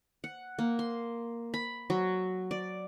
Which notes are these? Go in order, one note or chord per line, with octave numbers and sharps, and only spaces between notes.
F#5
A#3
C6
B5
F#3
D5